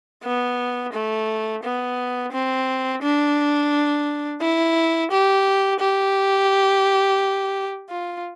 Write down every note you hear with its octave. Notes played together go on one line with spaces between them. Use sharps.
B3
A3
B3
C4
D4
E4
G4
G4
F4